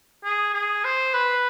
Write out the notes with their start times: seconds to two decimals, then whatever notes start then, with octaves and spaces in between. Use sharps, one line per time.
0.24 G#4
0.54 G#4
0.84 C5
1.14 B4